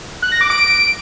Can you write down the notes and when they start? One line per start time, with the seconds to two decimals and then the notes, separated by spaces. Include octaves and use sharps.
0.22 F#6
0.32 A#6
0.41 D6
0.50 D7